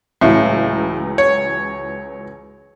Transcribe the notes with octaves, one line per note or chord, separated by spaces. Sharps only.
C#2 A2 E3 F#3 E5 F5
C#5